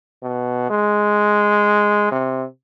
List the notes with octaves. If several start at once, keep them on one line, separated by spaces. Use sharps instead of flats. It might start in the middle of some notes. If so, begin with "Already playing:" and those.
B2
G#3
C3